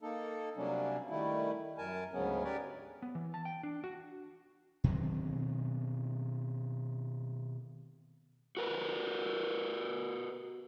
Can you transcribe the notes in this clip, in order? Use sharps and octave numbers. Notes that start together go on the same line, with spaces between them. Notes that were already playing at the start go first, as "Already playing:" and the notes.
A#3 D#4 A4
C3 F#3 G3 A#3 C#4 D4
D#3 G3 A3 E4
F#2 A#4 G#5 A5
D2 G#2 C#3 F#3 B3 C#4
G3 G4 A#4 B4 C#5 D5
B3
E3
A5
G5
D4
F#4
B2 D#3 F#3 C4
F#4 A#4 B4